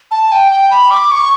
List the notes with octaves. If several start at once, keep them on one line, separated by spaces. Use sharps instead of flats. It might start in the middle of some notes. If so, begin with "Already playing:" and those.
A5
G5
G5
B5
D6
C#6